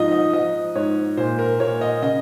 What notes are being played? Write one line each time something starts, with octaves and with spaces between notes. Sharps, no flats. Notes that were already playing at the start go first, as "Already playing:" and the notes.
Already playing: G#2 F3 D#4 F4 D#5
D#5
F3 D#5
G#2 C#5
A#2 C5
A#4
A#2 C#5
D#5
C#3 D#5